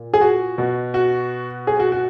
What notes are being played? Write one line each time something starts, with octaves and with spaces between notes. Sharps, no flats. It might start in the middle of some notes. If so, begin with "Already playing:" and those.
Already playing: A#2
G#4
F#4
B2
F#4
G#4
F#4
F#4